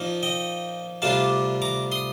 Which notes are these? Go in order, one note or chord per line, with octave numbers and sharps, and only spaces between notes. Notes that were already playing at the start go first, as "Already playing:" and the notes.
Already playing: A#2 F3 A#3 D#4
D#5 G5
D2 C3 G3 D4 F4 F5 A5
A#5 D6
C6 D#6